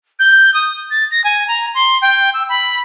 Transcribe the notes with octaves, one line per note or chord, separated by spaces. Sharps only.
G6
D#6
A6
A#6
G#5
A#5
C6
G5
E6
B5